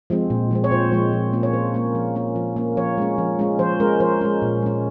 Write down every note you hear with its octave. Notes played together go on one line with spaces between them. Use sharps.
F3 G#3 C4
A#2
F3 G#3 C4
C#5
A#2 C5
F3 G#3 C4
F3
A#3 C#4
C#5
F3 C5
A#3 C#4
F3
A#3 C#4
F3
A#3 C#4
F3 C#5
G#3 C#4
F3
G#3 C#4
F3 C5
G#3 C#4 A#4
F3 C5
G#3 C#4
A#2
G#3 C#4